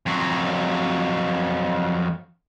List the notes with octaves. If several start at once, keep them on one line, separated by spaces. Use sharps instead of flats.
F2 F#3